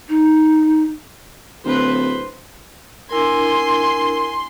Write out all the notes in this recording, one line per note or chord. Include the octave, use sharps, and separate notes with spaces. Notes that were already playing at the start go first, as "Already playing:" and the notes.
D#4
D1 B4 C5
D4 E4 A#4 G#5 C6